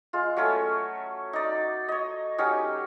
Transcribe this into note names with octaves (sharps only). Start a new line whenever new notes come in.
G#3 F4
F#3 A3 C#4 C#5
D#4 D5
C#5 D#5
F#3 C#4 D#4 G4